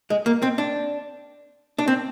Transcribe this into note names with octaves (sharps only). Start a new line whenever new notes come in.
G#3
A#3
C4
D4
D4
C4